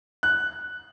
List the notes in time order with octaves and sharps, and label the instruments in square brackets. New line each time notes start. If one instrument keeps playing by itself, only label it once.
[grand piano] F#6